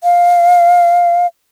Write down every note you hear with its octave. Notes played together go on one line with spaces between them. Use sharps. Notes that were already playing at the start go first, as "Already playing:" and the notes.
F5